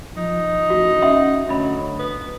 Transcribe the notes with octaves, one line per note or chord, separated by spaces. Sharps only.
F3 D#4
A1 F#4
C#4 E5 F#5 C6
D2 F#3 D#5 B5
B3